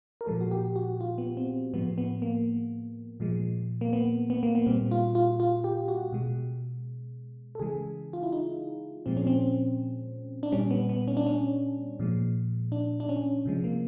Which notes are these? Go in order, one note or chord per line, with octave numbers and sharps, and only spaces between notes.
A#4
A#2 F3 G#3 A4
F#4
G4
F#4
F4
B3
C4
A2 F3 G#3 B3
B3
A#3
A#2 F3 G#3
A#3
B3
B3
A#3
B3
A#2 G3 C4
F4
F4
F4
G4
F#4
B2 G#3
A4
C#3 E3 G#3 G#4
F4
E4
D#4
A#2 F3 G#3 C4
C#4
C4
D4
A#2 G3 C#4
B3
B3
C#4
D4
C#4
A#2 F3 G#3
D4
D4
C#4
C3 F3 G#3
A#3